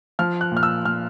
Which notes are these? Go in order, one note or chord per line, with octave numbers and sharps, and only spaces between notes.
F3 F6
F#6
A#2 F6
E6
A#2 F6